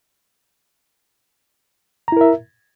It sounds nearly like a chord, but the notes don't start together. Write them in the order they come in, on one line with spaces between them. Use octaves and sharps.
A#5 E4 A#4 E5